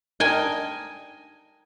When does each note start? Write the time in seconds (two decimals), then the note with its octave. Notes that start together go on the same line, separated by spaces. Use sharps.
0.20 D4 D#4 A#4 G5 G#5